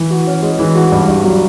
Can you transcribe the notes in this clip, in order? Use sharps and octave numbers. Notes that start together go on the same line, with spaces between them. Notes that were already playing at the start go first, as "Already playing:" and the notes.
Already playing: E3
F#4
C#4
G#3
E3
F#4
G2
G2
F#3